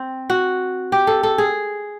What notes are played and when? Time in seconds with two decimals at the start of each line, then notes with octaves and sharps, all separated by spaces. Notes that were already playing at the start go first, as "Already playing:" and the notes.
Already playing: C4
0.30 F#4
0.92 G4
1.07 A4
1.23 A4
1.38 G#4